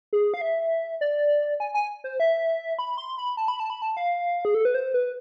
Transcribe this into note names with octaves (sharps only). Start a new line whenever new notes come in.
G#4
F5
E5
D5
G#5
G#5
C5
E5
B5
C6
B5
A5
B5
A5
B5
A5
F5
G#4
A4
B4
C5
B4